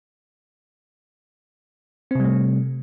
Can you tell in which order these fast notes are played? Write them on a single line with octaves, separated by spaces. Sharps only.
C4 C3 G3 A3